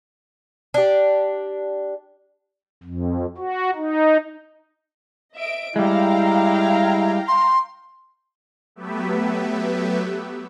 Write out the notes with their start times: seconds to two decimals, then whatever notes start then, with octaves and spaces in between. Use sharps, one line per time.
0.74 D4 G4
2.83 F2
3.38 F#4
3.75 D#4
5.34 D#5 E5 D7
5.76 G3 G#3 E4 F5 G5 A#5
7.28 C6
8.76 F#3 A3 B3 G4 B4 E5